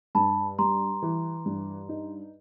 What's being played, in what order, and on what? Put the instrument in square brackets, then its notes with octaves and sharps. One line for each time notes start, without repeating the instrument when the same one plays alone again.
[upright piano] G2 [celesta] A5 B5
[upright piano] G3 [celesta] A#5 C6
[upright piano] E3
G2
D#4